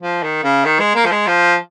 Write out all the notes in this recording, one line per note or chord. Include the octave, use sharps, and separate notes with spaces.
F3
D#3
C#3
D#3
G#3
A#3
F3
G#3
F3